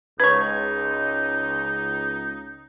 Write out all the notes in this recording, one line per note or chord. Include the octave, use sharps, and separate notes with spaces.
C#2 D#4 B4 C#5 G#6